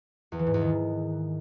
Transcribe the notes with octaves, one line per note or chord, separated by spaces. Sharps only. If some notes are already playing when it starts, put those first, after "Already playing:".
E2
E3
G#2
E2
D#3